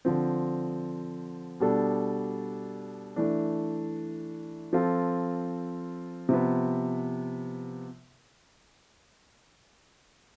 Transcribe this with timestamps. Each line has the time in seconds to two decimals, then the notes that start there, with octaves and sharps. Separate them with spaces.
0.05 D3 F3 C4
1.60 B2 G3 D4 A4
3.16 E3 A3 D4
4.73 F3 C4 F4 A4
6.29 C3 F3 B3